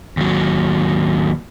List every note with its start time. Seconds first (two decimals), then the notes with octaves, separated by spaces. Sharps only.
0.17 D#2 F#3